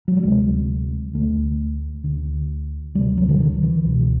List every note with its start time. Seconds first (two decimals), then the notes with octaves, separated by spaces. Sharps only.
0.08 F#3
0.17 G3
0.23 D2 C3 G#3
1.13 D2 D3 A3
2.04 D2 D3
2.95 D2 G3
2.98 C3
3.18 F#3
3.29 D3
3.40 D#3
3.63 E3
3.85 C#2 B2